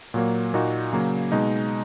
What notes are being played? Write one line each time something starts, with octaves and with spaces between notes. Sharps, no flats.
A#2 F#3 A#3
A#2 A#3 D#4 F#4
C#3 F#3 A#3
B2 G#3 D#4